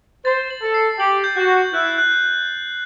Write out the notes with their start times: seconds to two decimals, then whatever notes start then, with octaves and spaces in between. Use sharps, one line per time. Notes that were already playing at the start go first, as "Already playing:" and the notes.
0.25 C5 A6
0.50 F#7
0.63 A4
0.74 C7
0.99 G4 F#7
1.24 G6
1.37 F#4
1.48 G6
1.73 E4 F#6
1.98 F#6